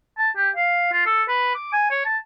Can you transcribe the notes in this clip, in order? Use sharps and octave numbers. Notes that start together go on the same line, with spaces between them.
A5
G4
F5
F4
A4
B4
D6
G#5
C#5
A5